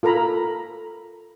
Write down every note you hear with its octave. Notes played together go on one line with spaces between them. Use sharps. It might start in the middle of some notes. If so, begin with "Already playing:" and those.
F4 A4 A#4 A#5 B5